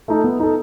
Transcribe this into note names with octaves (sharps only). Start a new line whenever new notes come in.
A3 D#4 A4
B3
D#4 A4